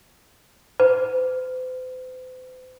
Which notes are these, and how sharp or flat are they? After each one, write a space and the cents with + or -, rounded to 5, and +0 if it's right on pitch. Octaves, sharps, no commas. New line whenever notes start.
C5 -45